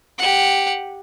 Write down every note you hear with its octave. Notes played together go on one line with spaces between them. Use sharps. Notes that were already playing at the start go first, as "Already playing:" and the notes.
G4 F#5